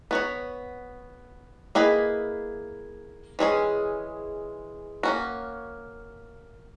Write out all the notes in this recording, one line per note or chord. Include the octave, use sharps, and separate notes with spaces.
B3 F#4 C#5
A#3 E4 G#4 B4 D#5
E3 G#3 C#4 G#4
A#3 C#4 F#4